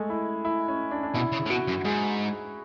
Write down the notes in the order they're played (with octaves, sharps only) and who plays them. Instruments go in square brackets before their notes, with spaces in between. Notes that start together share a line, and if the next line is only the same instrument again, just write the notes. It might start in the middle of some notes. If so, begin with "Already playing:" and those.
Already playing: [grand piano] G#3 A3
E4
E4
C#4
D4
D4
[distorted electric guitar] B2 [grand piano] E4
[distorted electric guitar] C#3
A2
[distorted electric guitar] B2 [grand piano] F#4
[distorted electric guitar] F#2
[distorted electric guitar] G#2 [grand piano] G#4